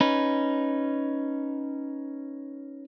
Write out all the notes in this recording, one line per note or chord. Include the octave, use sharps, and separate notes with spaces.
C#4 D#4 B4